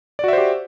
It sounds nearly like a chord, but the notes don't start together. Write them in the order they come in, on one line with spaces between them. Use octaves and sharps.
D5 F#4 E5 C5 G4